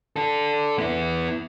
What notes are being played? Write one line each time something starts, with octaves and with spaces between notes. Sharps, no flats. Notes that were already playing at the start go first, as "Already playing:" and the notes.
D4 A4
B3 E4